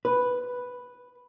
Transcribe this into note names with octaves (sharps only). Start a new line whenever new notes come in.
B4